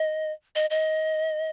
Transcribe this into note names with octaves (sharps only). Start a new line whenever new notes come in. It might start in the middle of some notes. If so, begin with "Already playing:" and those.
Already playing: D#5
D#5
D#5